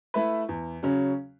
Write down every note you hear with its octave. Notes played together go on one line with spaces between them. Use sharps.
A3 E4 B4
E2
C#3 F#3 C#4